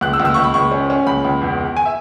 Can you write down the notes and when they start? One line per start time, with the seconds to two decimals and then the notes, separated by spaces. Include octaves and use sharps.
0.01 C#2 F#6
0.13 E6
0.20 C#2
0.25 E6
0.34 C#2 C#6
0.44 B5
0.54 C#2 C#6
0.72 C#4
0.90 C#4
1.07 C#2 B5
1.25 C#2
1.42 E2
1.59 E2
1.77 G#5
1.86 E5